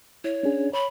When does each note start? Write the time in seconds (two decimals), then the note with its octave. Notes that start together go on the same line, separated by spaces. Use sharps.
0.24 E4 C#5
0.43 C#4 D4 G#4
0.73 C#5 B5